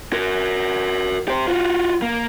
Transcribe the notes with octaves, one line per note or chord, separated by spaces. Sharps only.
F#4 A#4
G4 C5
F4 F#4
A#3